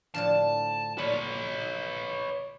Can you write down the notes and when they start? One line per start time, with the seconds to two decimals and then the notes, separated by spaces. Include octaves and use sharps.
0.14 A2 D3 F3 A5
0.98 A#2 B4 C#5